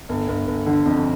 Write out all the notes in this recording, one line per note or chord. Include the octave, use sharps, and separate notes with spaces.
G1
G1
G1
D3
F2